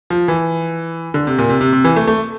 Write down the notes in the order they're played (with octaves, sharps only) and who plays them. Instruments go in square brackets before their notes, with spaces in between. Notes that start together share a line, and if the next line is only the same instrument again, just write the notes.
[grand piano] F3
E3
D3
C3
A#2
C3
C3
C3
E3
A3
A3